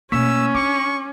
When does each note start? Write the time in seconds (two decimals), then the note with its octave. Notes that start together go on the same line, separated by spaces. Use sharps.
0.12 B2 A3 A#3 C#4 C#6 E6 B6
0.55 D4 C#6 D6